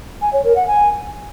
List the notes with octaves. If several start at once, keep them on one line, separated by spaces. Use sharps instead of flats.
G#5
C#5
A#4
F#5
G#5